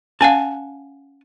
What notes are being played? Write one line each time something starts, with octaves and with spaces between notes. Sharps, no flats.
C#4 F5 F#5 G#5 A5